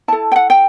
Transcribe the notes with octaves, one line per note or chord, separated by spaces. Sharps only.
E4 A4 A5
G5
F#5
G5